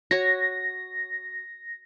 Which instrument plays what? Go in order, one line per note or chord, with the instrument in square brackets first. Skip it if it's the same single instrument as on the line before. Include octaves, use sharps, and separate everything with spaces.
[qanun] F#4 C#5 [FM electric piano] A#6